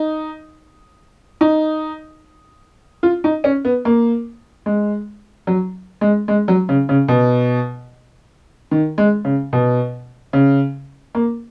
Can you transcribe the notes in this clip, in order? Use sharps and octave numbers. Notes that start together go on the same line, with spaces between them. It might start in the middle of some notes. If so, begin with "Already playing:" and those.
Already playing: D#4
D#4
F4
D#4
C#4
B3
A#3
G#3
F#3
G#3
G#3
F#3
C#3
C#3
B2
D#3
G#3
C#3
B2
C#3
A#3